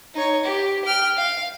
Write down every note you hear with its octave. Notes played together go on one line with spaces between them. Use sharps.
D#4 C#5
G4
G5 F6
F5